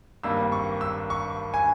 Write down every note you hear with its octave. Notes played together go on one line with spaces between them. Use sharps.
G#1 G2 G3 A#3 E6
C#6
E6
C#6
G#5